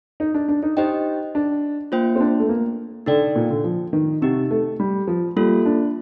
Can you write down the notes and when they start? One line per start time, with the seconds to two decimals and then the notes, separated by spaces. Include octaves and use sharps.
0.20 D#4
0.34 D4
0.48 D4
0.63 D#4
0.77 D#4 G4 C5 D#5 G5
1.35 D4
1.92 A#3 F4 C5 G5
2.16 C4
2.20 D4
2.40 A3
2.49 A#3
3.06 D3 D#4 A4 D5 G5
3.35 A#2
3.51 D3
3.64 F3
3.93 D#3
4.22 C3 C4 D#4 G4
4.51 A3
4.80 G3
5.07 F3
5.36 G3 A#3 F4 A4
5.65 D4